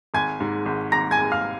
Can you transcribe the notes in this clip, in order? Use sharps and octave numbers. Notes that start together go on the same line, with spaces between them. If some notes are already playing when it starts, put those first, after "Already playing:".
G#1 G#5 G#6
G#2
G#1
G#1 A#5 A#6
G#5 G#6
G#1
F5 F6